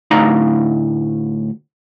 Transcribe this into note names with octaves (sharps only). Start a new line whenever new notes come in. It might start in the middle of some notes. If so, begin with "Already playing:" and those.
D2 A2 D#4 D5 F5 A#5